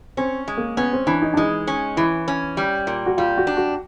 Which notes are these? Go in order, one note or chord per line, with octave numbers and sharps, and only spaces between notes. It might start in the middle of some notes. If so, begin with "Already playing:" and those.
C4 C#4
G#3
A#3
B3 C#4
C4
E3 D4
D#4
D4
G#3 D#4
C#4
E3 E4
C#4
G3
A#2
F#4
G3 F4
F#4
D4
F#4